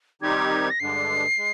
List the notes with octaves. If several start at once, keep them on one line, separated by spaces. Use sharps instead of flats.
D#3 G3 C4 D#4 G4 G#6
A#6
G2 D3 G#3 D4 C7
G#3